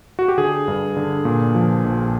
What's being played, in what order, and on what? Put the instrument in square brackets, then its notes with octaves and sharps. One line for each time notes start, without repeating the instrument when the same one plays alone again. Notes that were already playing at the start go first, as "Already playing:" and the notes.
[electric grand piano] F#4
G4
D3 G#4
G2
D3
A#2
F3
A#1